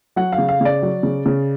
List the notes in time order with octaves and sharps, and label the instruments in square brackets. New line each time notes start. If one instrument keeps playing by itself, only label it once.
[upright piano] F#3 F#5
F5
C#3
F5
C#3 D5
F#3
C#3
C#3